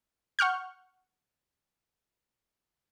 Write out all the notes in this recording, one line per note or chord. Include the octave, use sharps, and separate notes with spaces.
F#5 C#6 F6 G6